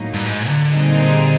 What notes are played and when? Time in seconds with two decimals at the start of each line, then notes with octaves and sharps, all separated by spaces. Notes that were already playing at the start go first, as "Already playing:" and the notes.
Already playing: A2 F#3 A#3 D#4
0.13 G2
0.24 G#2
0.48 D3
0.72 A#2 G3 C4 D#4 G#4